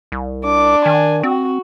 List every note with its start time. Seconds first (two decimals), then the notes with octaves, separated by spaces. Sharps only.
0.12 C2
0.45 D4 D6
0.86 D#3 G#5
1.23 C4 F#4